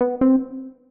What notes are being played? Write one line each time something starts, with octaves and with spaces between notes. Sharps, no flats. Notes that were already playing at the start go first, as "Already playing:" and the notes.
B3
C4